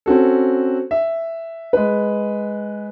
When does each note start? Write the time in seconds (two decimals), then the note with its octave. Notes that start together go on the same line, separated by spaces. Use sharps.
0.06 C4 C#4 F#4 A4
0.91 E5
1.73 G#3 B4